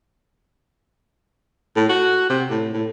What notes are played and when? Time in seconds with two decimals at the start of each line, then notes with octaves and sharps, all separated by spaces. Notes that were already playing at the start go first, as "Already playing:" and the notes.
1.76 A2
1.89 F#4
2.30 C3
2.50 A2
2.74 A2